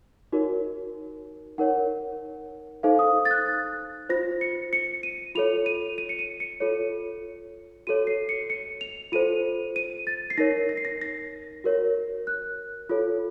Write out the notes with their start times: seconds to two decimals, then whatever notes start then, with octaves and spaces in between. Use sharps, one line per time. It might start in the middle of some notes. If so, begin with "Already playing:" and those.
0.32 D#4 F#4 A#4 C#5
1.58 D#4 A#4 C#5 F#5
2.83 D#4 A4 C5 F5
2.99 D#6
3.25 A6
3.31 F#6
3.47 A6
4.09 F4 C5 A#6
4.41 C#7
4.73 C#7
5.03 D#7
5.35 F4 A4 C#5 F7
5.66 D#7
5.98 D#7
6.09 C#7
6.19 D#7
6.40 C#7
6.60 F4 A4 C#5
7.87 F#4 A4 C#5 D#7
8.07 C7
8.29 C#7
8.50 C#7
8.81 F7
9.12 F4 A4 C5 D#7
9.76 D#7
10.07 A6
10.30 C7
10.38 D#4 A#4 C#5 A#6
10.69 A#6
10.77 C7
10.85 A#6
11.01 A#6
11.64 F#4 A#4 C#5
12.27 F#6
12.89 F4 A4 C#5